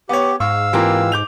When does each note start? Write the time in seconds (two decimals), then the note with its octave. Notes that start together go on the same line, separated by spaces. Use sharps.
0.09 B3 G4 C#5
0.40 G#2 F5 C#6 E6
0.73 E3 A#3 C4 F4 G4 A#5
1.12 D6 G6 F7